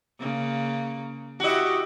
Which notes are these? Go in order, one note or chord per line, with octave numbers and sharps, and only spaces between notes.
C#3 A#3
E4 F#4 G4 D#5